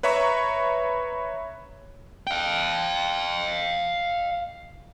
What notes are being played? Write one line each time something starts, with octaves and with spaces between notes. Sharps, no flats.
B4 C#5 E5 A#5 B5 C#6
F5 G5